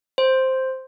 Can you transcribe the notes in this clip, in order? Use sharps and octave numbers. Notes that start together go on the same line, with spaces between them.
C5